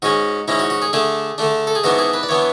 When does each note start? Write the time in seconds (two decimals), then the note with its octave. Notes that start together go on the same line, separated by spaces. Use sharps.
0.02 G#2 G#3 C#4 F#4
0.48 G#2 G#3 C#4 E4
0.59 F#4
0.70 F#4
0.82 G#4
0.93 D3 A3 D4 G#4
1.38 D3 A3 D4
1.67 A4
1.75 G#4
1.84 G#2 E3 B3 D4 F#4
1.98 G#4
2.14 B4
2.23 D5
2.29 E3 B3 D4 C#5